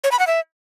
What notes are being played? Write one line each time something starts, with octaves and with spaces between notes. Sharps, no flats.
C#5
B5
F#5
E5